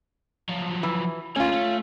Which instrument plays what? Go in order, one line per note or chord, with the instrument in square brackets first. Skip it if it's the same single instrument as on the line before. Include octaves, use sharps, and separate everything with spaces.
[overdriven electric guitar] F3 F#3
[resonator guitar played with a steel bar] E3
[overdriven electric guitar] A3 A#3 [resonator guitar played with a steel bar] C#4 F4
[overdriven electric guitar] A3